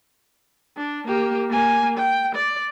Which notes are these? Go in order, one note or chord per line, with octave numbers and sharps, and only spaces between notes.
D4
A#3 G4
A#3 G#5
G5
D5